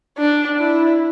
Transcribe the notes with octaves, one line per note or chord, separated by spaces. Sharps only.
D4
E4